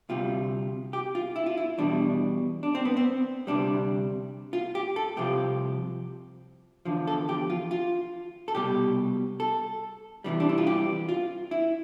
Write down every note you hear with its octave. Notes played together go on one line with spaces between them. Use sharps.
D2 C3 G3 F4
G4
F4
E4
F4
E4
E2 B2 G3 D4
D4
C4
B3
C4
D2 C3 G3 D4
F4
G4
A4
C2 C3 F3 G4
E2 D3 F3
A4
G4
F4
F4
A4
C2 B2 G3 G4
A4
C2 C3 E3 G3
D4
E4
F4
G4
F4
E4